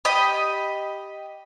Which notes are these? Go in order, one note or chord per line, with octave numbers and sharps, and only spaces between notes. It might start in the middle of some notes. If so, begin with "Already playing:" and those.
G4 D#5 B5